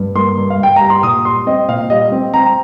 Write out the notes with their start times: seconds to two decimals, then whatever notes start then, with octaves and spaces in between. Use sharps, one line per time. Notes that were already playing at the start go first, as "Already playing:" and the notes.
Already playing: G2
0.15 A#3 C6
0.38 G2
0.50 F5
0.60 G2 G5
0.76 G3 A#5
0.90 C6
1.03 A#2 D#6
1.25 G3 C6
1.47 C4 D#5
1.68 A#2 F5
1.90 G3 D#5
2.12 C4
2.34 C4 A#5